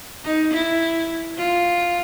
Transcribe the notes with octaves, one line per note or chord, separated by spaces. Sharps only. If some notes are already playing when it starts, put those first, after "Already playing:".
D#4
E4
F4